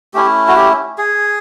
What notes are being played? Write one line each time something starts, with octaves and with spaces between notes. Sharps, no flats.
A3 C#4 E4 G4
F#4
G4
G#4